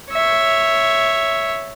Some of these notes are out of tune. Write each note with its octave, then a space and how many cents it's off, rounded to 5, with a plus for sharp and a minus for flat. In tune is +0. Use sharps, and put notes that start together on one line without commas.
C#5 +0 E5 +0